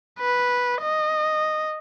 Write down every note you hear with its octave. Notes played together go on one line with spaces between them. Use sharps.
B4
D#5